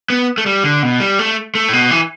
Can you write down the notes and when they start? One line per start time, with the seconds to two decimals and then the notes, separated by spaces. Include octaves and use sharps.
0.10 B3
0.38 A3
0.46 G3
0.64 D3
0.83 B2
1.00 G3
1.19 A3
1.55 A3
1.68 A2
1.73 B2
1.91 E3